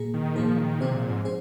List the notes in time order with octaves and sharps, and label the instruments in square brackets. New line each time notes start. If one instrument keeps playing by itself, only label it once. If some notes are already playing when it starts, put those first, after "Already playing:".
Already playing: [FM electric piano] A#2 A#3 G#4
[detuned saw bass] D#3
[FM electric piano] A#2 A#3 G#4 [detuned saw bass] F3
[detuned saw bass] D#3
[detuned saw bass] C3 [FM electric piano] F3 C4 G#4 C5
[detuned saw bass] A#2
G#2
[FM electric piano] C4 G#4 C5